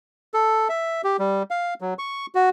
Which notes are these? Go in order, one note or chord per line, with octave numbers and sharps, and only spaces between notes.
A4
E5
G4
G3
F5
F#3
C#6
F#4